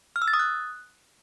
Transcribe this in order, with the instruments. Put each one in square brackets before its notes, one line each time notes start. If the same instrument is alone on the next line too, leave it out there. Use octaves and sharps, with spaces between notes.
[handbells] F6
E6
A6
D#6
F#6